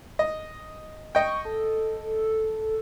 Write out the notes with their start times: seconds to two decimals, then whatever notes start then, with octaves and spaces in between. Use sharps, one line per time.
0.19 D#5
1.15 D#5 G5 C#6
1.45 A4